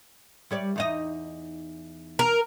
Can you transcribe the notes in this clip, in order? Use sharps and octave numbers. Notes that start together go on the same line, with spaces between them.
G3 C#5 D5
E2 D#4 D#5
A#4